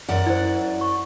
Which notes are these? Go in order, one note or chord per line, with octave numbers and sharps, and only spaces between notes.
F#2 D5 F#5
E4 C5
C#6